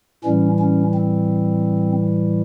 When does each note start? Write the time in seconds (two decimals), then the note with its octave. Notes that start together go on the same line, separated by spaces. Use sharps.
0.24 A2 E3 G3 C#4
0.59 C#4
0.94 C4